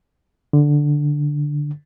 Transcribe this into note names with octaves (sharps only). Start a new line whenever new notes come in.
D3